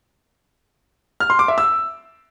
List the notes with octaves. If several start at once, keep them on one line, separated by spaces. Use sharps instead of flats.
F6
C6
D6
E5
E6